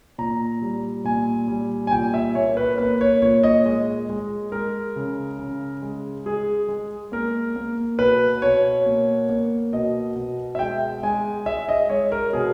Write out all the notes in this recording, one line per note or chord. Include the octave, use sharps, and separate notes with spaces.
A#2 A#5
G3
A#2 G#5
G3
G#5
A#2 G5
E5
A#3 C#5
B4
A#3 B4
C#5
A#2 C#5
D#5
G#3
G#3
G#3 A#4
C#3
C#3
G#3
G#3 G#4
G#3
A#3 A#4
A#3
B2 B4
B2 C#5
A#3
A#3
B2 D#5
B2
E5
G#3 G5
G#3 G#5
G#3 E5
D#5
G#3 C#5
A#4
B2 G#4